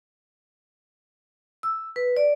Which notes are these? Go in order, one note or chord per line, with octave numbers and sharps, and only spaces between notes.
E6
B4
D5